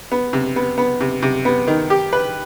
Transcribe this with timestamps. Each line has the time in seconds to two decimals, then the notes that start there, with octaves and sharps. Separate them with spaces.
0.12 B3
0.33 C3
0.56 B3
0.78 B3
1.00 C3
1.22 C3
1.45 B3
1.68 D#3
1.90 G4
2.13 B4